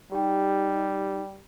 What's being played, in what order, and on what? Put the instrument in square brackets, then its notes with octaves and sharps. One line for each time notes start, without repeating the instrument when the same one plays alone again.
[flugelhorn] G3 [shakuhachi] D#4 [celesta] G4 G5